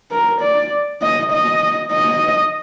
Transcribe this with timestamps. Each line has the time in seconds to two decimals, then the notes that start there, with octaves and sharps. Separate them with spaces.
0.12 A#4
0.41 D5
1.02 D#5
1.32 D#5
1.92 D#5